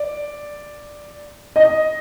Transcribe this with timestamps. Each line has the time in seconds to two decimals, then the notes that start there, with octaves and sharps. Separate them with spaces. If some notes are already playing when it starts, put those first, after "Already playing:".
Already playing: D5
1.56 D#5